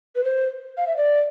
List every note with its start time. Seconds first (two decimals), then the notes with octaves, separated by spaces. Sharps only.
0.16 B4
0.24 C5
0.77 F5
0.87 E5
0.97 D5